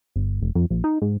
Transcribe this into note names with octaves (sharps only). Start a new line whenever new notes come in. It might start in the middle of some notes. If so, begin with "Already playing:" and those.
G1
F1
F2
A#1
D#4
G#2